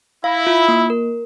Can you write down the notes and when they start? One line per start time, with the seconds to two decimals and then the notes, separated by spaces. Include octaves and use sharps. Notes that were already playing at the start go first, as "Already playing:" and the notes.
0.24 E4 F5
0.47 F4
0.68 A#3
0.90 A#4